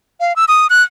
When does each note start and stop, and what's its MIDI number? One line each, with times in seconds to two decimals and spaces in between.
0.20 0.35 77
0.36 0.45 88
0.48 0.67 87
0.70 0.82 90